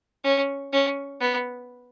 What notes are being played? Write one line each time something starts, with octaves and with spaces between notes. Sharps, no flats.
C#4
C#4
B3